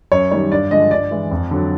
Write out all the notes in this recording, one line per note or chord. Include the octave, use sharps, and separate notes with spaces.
F#2 C#5
D#3 G3 C#5
G2 D5
D3 F3 G#3 D#5
G2 D5
E3 G#3
F2
D3 F#3